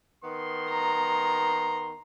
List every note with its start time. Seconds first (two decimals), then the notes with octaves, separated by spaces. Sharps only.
0.24 D#3 B3 C6
0.70 A#5